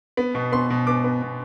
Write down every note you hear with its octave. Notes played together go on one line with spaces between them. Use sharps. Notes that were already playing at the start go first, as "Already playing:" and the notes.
B3
B2
B3 C6
B2
B3 D6
B3
B2